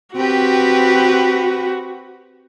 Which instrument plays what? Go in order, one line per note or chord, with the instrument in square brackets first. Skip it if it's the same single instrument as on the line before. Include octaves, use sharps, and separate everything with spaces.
[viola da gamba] C4 G4 B4 [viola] F#4